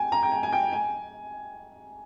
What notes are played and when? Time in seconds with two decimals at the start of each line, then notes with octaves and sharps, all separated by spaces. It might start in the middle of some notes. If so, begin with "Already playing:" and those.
Already playing: G5 G#5
0.12 A#5
0.23 G5
0.32 G#5
0.43 G#5
0.52 G5
0.73 G#5